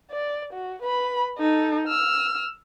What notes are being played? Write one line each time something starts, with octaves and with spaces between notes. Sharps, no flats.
D5
F#4
B4 B5
D#4 A4
E6 F6